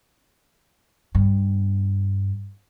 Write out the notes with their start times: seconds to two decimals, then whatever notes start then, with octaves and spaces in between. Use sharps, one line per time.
1.15 G2 B3